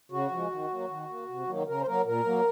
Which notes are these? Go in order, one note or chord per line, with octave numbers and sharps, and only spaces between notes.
C#3 F#4
F3 G#3
D#3
F#3 A#3
D#3
A#3
C3
D#3 F#3 A#3
C#3 A#4
C5
F#3 A#3 A#4
A#2 A#4
F#3 A#3